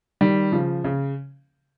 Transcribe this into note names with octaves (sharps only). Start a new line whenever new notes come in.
D#3 G3
C#3 F3
C#3